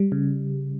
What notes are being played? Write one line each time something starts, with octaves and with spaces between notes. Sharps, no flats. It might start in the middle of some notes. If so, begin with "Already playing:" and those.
Already playing: G3
C#3